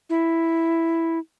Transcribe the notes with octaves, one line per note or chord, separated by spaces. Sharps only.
E4